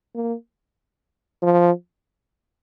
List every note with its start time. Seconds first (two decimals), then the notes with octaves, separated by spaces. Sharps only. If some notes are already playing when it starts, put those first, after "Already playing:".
0.15 A#3
1.42 F3